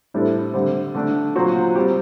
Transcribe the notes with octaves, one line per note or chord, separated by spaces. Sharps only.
A2 G3 D4 A4 C5
D3 G3 C4
D3 A3 D4
A#2 F#3 C4 F#4 C5
G3 C4 G4